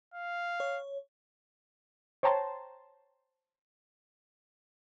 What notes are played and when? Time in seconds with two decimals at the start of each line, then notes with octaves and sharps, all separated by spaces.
0.14 F5
0.60 C#5
2.23 C5 C#5 G5 A5 A#5 C6